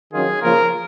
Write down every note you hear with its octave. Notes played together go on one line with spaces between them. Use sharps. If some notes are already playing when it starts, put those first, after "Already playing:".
D#3 F#3 C#4 F4 G#4
C#3 F3 A#3 F4 A#4